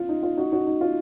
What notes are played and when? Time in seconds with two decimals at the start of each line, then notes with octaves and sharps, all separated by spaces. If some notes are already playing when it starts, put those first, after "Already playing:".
Already playing: F4
0.09 D#4
0.23 F4
0.37 D#4 F#4
0.52 D#4 F#4
0.67 D#4
0.81 F4